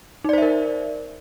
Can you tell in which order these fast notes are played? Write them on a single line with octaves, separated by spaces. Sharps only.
D#4 D5 C5 E5 A#4